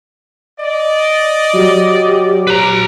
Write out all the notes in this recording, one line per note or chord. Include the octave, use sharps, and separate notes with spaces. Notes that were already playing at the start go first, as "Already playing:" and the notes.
D5 D#5
F#3 G4
B4 A#5